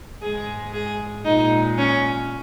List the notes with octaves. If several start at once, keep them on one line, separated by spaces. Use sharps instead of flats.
G#2 G#3 G#4
G#4
A#2 G#3 D#4
C#4